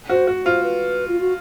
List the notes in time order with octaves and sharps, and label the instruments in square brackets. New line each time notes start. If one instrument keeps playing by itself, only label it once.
[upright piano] F#4 [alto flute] C5
[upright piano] F#4
[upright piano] F4 [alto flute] C5
[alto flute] B4
F4
F#4